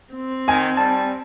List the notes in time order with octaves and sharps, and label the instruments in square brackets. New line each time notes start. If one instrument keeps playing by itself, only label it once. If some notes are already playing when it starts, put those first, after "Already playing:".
[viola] C4
[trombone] D#3 [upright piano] G#5
[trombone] G3 [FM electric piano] A5